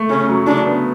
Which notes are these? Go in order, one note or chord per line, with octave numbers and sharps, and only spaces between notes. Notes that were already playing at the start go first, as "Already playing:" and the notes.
Already playing: A3
C#3 C#4
F#3
C#3 D4
B3